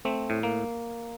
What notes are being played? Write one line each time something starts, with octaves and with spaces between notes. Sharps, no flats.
A3 C4
A2
A#3